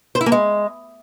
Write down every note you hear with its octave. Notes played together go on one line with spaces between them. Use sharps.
C5
E4
A#3
G#3